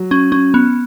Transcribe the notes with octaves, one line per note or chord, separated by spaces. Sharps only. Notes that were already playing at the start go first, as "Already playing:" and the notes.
Already playing: F#3
C#4
C#4
B3